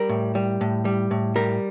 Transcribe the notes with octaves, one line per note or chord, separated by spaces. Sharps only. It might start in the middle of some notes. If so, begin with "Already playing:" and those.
Already playing: G3 A#4
A2
G3
A2
G3
A2
G3 A#4